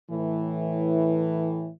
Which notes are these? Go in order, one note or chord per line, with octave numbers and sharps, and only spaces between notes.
A2 E3